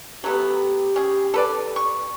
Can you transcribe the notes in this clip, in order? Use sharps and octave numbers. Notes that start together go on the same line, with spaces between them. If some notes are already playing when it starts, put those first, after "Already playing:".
F#3 A3 B3 G4
C#4 G#4
A4 B4 D5
C#6